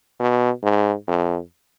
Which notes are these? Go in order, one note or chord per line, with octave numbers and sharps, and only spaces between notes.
B2
G#2
F2